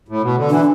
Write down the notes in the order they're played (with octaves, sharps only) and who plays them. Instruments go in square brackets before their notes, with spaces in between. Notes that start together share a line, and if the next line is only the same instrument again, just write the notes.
[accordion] A2
B2
D3
[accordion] E3 [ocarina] D4